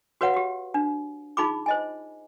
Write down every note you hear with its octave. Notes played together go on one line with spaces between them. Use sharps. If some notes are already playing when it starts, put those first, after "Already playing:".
F#4 B4 C#5 F5 F#5
F#4 G4
D4
D#4 F4 G#4 B5 D6
C5 D#5 G#5